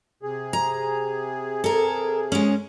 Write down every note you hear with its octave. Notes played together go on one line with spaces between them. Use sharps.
C3 G#4
A#5
A4 A#4
G#3 C#4